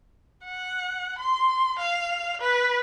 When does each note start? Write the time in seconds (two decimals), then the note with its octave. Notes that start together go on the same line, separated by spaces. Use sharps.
0.45 F#5
1.18 C6
1.78 F5
2.41 B4